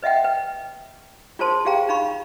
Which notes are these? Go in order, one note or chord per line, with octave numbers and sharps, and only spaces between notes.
B4 D#5 E5 F#5 G5
B4 G5
F4 G#4 A#4 C5 A5 C6
F4 G4 G#4 F5 G5 A#5
D#4 F4 F5 A#5 B5 C#6